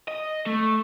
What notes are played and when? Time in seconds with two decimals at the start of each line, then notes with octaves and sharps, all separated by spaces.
0.08 D#5
0.46 A3